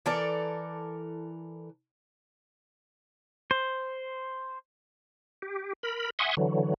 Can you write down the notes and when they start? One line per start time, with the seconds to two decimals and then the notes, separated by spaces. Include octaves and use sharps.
0.06 E3 A4 A#4 D5
3.51 C5
5.42 G4
5.83 A#4 B5
6.19 E5 F#5 G#5 C6 C#6 D#6
6.37 D3 E3 F#3